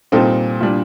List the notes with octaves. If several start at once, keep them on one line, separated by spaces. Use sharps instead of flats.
A#2 G3 C4 D#4 A4
A#2 G3 D4